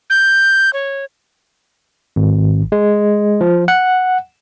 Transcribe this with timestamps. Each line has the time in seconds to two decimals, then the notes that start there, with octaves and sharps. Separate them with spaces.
0.10 G6
0.73 C#5
2.16 G#1
2.72 G#3
3.41 F3
3.68 F#5